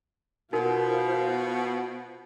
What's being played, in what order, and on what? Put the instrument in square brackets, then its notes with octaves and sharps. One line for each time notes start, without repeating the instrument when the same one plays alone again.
[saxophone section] B2 [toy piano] D#4 F#4 A#4 [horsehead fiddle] F4 C5